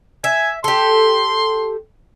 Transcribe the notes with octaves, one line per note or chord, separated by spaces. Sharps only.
E5 G#5
G4 A4 C6